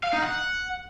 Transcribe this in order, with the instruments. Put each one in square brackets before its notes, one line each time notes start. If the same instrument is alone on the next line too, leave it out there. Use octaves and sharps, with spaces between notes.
[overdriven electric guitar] F5
D#4
F#5